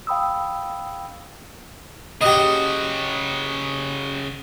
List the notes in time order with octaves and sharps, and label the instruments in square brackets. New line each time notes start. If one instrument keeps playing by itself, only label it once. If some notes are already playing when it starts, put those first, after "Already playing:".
[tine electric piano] F5 G5 B5 D#6 E6
[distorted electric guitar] C#3 F#4 [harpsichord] G4 D#5